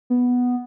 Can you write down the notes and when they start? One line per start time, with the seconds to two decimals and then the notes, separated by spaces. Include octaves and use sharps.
0.10 B3